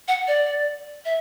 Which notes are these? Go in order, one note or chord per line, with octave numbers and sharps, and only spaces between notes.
F#5
D5
E5